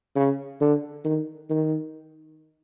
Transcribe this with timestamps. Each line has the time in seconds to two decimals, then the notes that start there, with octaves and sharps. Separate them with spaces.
0.16 C#3
0.61 D3
1.05 D#3
1.50 D#3